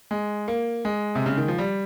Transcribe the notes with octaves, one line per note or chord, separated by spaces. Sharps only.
G#3
A#3
G#3
C3
C#3
D#3
F3
G3